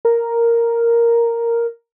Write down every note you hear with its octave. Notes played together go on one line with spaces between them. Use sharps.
A#4